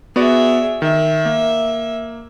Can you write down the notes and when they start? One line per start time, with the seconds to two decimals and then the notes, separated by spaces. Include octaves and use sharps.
0.16 B3 F#4 G#4 D5 E5
0.82 D#3 E5
1.26 A#3